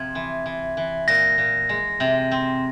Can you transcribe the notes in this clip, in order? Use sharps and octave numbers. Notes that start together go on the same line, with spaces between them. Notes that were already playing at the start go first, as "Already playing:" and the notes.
Already playing: C3 F3 G#6
E3
E3
E3
A#2 A#6
A#2
G#3
C3
C4